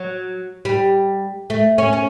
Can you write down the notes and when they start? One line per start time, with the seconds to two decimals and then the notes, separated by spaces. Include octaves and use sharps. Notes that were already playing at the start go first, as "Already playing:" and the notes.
Already playing: F#3
0.65 G3
1.50 A3
1.78 C#4
1.93 C#4